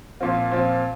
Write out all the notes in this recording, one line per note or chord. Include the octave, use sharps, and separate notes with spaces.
A#2 F3 C4 F4
A#2 F3 C4 F4